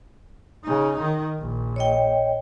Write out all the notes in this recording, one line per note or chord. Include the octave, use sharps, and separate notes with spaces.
C#3 D#4
D#3
A#1
C#5 D#5 G5